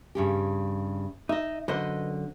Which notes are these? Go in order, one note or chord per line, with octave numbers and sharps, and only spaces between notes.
G2 C#3 G4
D#4 D#5 E5
F#2 D3 B4 C5 D#5